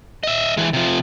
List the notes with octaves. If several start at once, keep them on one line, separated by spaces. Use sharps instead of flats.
D#5 E5
E3 G#3
C3 F3